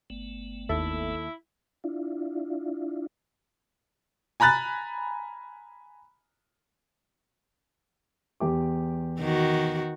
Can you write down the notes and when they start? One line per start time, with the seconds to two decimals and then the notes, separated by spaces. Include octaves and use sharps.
0.10 G1 A3 B3
0.69 D#2 E4 A4 E5
1.84 D4 E4 F4
4.40 G#5 A#5 B5 F#6 A6
8.40 E2 G4 D6
9.20 D#3 F#4